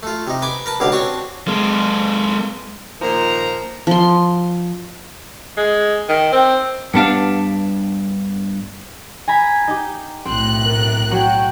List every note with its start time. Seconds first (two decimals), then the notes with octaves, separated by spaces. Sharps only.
0.03 A3 F4
0.27 C3 D#4
0.42 B4 G#5 D6
0.66 A#4 B4 A5
0.80 C#2 B2 D3 G4 F5
0.92 C4 D4 F#4 C#5 G#5 A5
1.48 G#3 A#3
3.01 A#2 D#3 F3 A#3 C5 A#5
3.87 F3 C6
5.57 G#3
6.09 D#3
6.32 C4
6.94 G2 B3 D4 F5
9.28 G#5 A#5 B5
9.68 D#4 G4
10.25 B1 A2 C4 F#6
10.63 A#4
11.11 F#3 F#4 C#5 G5